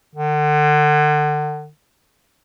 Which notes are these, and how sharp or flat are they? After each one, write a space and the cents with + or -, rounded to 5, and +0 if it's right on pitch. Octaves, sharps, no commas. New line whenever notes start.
D3 +35